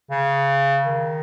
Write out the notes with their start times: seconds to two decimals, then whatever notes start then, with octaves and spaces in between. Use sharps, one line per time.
0.10 C#3
0.84 D#3